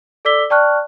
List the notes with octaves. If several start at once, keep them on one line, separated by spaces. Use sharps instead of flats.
A4 D5 D6 E6 B6 G7
D5 G5 A5 C#6 F6 F#6